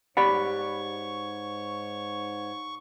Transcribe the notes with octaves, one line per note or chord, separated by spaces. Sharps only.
G#2 G4 C#5 D5 F#5 B5 C#6